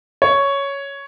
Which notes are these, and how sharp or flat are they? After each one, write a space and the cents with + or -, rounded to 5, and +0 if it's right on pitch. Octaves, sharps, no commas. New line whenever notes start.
C#5 +5